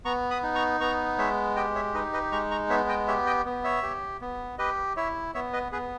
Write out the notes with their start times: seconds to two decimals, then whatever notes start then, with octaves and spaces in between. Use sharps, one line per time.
0.05 B3 A#5 C#6
0.30 B5 D#6
0.43 D#4
0.55 A#5 C#6
0.80 B3 A#5 C#6
1.18 G#3 C#5 E5
1.56 G4 D#5 G5
1.75 C#5 E5
1.94 D#4 B4 D#5
2.13 B4 D#5
2.32 G#3 A#5 C#6
2.51 A#5 C#6
2.69 B3 C#5 E5
2.89 D#5 G5
3.08 G4 C#5 E5
3.26 D#5 G5
3.45 B3
3.64 C#5 E5
3.83 G4
4.21 B3
4.58 G4 B4 D#5
4.97 E4 C#5 E5
5.34 B3 C#5 E5
5.53 B4 D#5
5.72 B3 G#4 B4